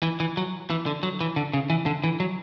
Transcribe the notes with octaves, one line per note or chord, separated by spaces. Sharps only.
E3
E3
F#3
E3
D3
F#3
E3
D3
C#3
E3
D3
E3
F#3